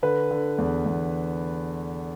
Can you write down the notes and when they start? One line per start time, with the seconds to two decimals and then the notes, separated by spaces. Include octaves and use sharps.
0.03 D3 B4
0.31 D3
0.58 E2
0.86 E2